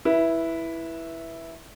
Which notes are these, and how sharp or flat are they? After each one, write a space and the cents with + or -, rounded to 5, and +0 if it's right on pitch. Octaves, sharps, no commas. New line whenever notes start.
E4 +0 B4 -20